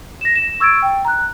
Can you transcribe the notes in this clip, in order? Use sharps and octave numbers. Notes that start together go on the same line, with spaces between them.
A#6 E7
E7
C#6 E6 G#6 A6 D7
G5
A#5 F#6